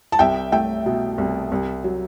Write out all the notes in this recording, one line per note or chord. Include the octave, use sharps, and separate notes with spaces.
A5
C2 E5 G5
A3 E5 G5
B2
C2
C2
F#3